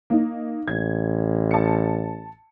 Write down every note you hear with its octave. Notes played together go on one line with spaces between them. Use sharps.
A#3 D#4
A1 G#6
A5 C#7